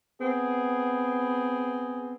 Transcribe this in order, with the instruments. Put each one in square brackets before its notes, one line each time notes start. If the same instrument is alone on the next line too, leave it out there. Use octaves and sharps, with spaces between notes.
[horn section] B3 C4 G#4